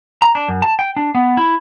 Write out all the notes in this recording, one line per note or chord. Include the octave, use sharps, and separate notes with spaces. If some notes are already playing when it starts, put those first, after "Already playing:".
A#5
D4
F#2
A5
G5
D4
B3
E4